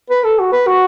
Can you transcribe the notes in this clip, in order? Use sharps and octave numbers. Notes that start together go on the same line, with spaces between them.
B4
A4
F#4
B4
F#4